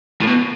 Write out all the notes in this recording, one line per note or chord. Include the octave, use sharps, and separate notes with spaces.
A2
B2